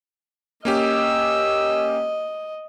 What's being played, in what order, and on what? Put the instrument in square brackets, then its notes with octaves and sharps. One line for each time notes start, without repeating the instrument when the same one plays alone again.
[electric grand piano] A#3 C#4 G4 [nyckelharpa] D#5 [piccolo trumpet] E6